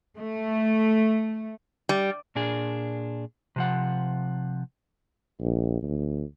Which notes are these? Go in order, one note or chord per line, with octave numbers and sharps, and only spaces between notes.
A3
G3
A#2 D4 G#4
C3 F3 F#5
A#1
D2